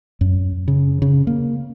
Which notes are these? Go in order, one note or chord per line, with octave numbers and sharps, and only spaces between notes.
F#2
C#3
C#3
A#3